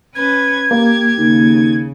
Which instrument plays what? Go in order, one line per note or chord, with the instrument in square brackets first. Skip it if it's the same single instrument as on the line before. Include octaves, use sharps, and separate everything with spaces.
[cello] C#4 B4 [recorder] G#6
[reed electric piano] A#3 [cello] G4
[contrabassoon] D#2 [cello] C#3